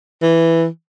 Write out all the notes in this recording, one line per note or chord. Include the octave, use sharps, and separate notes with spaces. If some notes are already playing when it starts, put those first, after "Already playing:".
E3